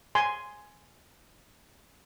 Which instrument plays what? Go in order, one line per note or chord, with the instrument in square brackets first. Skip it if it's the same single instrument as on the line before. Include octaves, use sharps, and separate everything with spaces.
[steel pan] G#5 C6